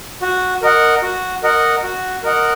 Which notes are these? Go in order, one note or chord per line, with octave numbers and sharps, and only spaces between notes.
F#4
A#4 D#5 F#5
F#4
A#4 D#5 F#5
F#4
A#4 D#5 F#5